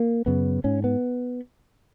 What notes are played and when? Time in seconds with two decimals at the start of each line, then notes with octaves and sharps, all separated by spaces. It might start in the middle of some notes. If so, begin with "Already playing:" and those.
Already playing: A#3
0.26 F#2 C#3 B3
0.64 G#2 C#4
0.84 B3